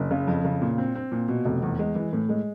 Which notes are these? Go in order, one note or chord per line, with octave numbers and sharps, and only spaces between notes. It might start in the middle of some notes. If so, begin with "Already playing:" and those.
Already playing: F#1
C#3
F2
C#3
A#2
C4
C4
A#2
B2
F1
E2
G#3
E3
A2
G#3